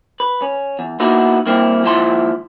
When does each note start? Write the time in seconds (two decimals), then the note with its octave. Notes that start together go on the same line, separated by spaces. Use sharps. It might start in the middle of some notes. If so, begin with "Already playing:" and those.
0.20 B4
0.42 C#4
0.79 E2
1.00 A#3 B3 D#4 E4 F#4
1.46 G2 A#3 C4 E4
1.83 D#2 G#2 F3 E4 A5 C6